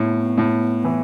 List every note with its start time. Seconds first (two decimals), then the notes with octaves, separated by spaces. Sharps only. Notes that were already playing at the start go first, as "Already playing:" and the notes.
Already playing: A2 B3
0.38 A2
0.84 E3